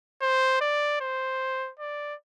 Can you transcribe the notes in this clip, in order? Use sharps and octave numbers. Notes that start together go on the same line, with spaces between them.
C5
D5
C5
D5